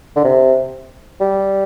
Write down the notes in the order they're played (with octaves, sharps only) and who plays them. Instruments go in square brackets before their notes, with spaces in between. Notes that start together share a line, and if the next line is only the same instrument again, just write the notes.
[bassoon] D3
C3
G3